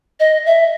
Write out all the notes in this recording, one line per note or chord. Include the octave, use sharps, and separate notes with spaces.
D#5
E5